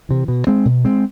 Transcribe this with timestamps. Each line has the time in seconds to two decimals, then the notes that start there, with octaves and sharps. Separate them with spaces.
0.09 C3 E3
0.28 B2
0.47 G#3 C4
0.65 B2
0.84 G#3 C4